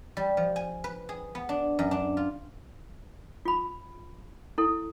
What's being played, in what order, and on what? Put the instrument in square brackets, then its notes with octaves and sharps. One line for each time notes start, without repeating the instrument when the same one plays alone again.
[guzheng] G3
F3
G#5
B4
G#4
B3
D4
F#2
D4
F4
[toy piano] F4 B5
E4 A4